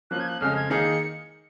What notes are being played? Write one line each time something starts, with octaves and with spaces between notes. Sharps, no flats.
F3 A#3 C#4 F4 F#6
G#6
F#6
F2 C#3 G#3 F6
G#6
D#3 A#3 D#4 G#4 C#7